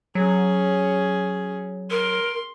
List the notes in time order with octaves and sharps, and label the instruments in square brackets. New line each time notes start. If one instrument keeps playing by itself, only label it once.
[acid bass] F#3 [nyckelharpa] C#4 G#4
[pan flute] A#4 [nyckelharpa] C6